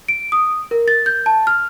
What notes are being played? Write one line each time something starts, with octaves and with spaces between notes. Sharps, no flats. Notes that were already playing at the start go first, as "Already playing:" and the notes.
D7
D#6
A#4
A6
G6
A5
F6